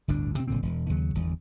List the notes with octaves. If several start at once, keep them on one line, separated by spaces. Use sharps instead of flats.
G1 D2 A2 D4
C3 C4
F1 A#2 D3 C4
E1
D#2 C#3 F#3
G1 E2